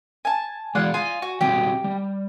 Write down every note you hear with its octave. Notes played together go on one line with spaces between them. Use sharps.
G#5 A5
E3 G#3 D5 F5 F#5
F4 D#5 G#5
F#4
F#3 G3 C4 G4
G3